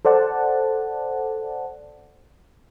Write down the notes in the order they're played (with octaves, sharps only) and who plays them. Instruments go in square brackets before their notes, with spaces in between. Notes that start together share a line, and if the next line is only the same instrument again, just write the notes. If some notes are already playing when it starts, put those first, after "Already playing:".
[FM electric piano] A4 C5 D5 F#5 A5